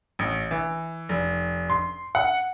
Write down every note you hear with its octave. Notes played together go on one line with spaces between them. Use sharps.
A1
E3
F1
C6
F#5